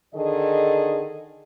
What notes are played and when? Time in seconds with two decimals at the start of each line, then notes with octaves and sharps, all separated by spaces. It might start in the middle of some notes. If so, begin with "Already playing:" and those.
0.14 D3 D#3 G#4 A4 D#5